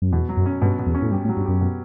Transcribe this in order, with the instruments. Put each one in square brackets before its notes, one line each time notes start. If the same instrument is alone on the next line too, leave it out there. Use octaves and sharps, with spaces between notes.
[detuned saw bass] F#2
[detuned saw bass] E2 [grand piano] B2
[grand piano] F#3
[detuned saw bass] F#2
[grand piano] C#4
[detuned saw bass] G2 [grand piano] B2
[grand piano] B2
[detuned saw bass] E2
[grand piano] C#4
[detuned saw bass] A2
[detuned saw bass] G2 [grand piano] G4
[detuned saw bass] A2
[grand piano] F#3
[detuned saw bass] G2
[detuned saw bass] F#2 [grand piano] G4
[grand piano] B2